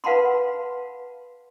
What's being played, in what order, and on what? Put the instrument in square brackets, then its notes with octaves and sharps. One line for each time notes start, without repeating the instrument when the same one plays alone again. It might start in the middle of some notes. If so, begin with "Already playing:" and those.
[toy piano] B4 F5 F#5 A5 B5 C6